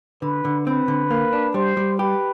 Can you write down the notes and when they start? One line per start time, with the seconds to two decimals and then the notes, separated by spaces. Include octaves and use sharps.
0.22 D3 B4
0.45 D3
0.67 C4 B4
0.88 D3
1.10 A#3
1.33 D4
1.54 G3 C5
1.77 G3
1.99 G4 B4